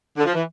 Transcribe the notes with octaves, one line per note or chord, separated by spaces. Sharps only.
D3
F3
E3